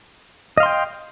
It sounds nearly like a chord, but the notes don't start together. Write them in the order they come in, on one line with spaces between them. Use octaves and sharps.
D#5 F5 C6 G5